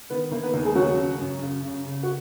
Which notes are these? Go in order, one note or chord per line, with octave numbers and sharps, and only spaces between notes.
D#3 B3 B4
D#3 A#3 A#4
B3 B4
D#2 A#3 A#4
G#3 G#4
C#3 F#3 F#4
C#3
F#2
C#3
C#3
C#3
F#4